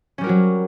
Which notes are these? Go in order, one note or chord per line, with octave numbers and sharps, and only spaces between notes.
F#3 G3 C#4 F#4 A#4